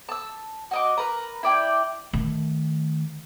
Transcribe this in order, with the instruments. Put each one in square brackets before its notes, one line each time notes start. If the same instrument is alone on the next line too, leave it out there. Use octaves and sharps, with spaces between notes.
[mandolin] A5 E6
F#4 D#5 D6
A#4 B4 A#5
E4 D5 G5
[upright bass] D#3 A3